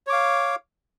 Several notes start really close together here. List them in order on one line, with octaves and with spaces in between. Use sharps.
C#5 D6 F5